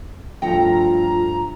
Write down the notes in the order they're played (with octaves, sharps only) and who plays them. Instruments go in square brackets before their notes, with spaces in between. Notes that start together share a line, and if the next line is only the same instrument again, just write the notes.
[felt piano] G2 F3 A3 [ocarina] F4 [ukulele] A4 G5 [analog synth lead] A#5